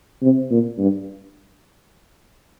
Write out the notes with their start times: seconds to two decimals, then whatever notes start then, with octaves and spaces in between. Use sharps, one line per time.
0.22 C3
0.51 A#2
0.79 G2